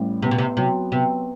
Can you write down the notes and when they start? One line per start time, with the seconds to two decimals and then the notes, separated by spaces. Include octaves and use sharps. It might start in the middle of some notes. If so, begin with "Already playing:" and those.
Already playing: A1 G3
0.22 C3 B3
0.31 B2
0.38 C3
0.57 C3 F#3
0.92 C3 B3